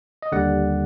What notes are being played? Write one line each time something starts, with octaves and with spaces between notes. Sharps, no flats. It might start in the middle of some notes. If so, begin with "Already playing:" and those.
D#5
D#2 D3 G3 D5 F#5